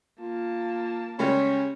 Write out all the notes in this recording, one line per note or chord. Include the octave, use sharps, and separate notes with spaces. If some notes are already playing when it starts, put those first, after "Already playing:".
A#3 F4 A5
C#3 G3 G#3 C#4